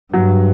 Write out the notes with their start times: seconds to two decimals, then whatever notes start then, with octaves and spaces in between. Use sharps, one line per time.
0.14 G2 F#3